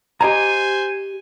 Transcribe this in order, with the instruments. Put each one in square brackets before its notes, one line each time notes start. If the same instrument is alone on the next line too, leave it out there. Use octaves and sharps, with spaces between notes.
[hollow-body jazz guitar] G4 D#5 A#5 [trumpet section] C5 G#5